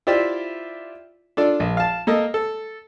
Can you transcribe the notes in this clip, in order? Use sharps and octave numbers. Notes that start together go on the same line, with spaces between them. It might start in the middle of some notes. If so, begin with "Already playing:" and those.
E4 F4 G4 C5 D5 E5
D4 F4 A4 D5
A#1
F5 A5
A#3 A4 D#5
A4